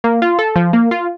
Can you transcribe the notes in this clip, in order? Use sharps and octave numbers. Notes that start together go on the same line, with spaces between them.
A#3
F4
A4
F3
A#3
F4